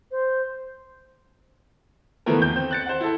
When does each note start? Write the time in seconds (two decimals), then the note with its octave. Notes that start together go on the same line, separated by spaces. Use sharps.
0.11 C5
2.26 D3 E3 F3 A3 B3 A#4
2.38 D#2 G6
2.56 C4
2.71 F#6 A6 C#7
2.86 C5 F#5
3.01 E4 A4